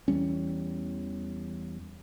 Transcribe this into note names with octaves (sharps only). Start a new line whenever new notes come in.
E2 E3 G3 C#4